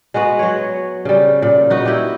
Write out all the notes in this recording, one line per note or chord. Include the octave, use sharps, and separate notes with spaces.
G#3 B3 F#4 B4
F#3 C#5
C#3 G3
A#2
D#4 F#4 B4
E4 G4